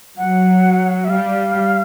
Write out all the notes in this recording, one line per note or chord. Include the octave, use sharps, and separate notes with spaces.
F#3 F#5
E5
G3 F5